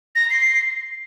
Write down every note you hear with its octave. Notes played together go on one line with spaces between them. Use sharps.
A#6
C7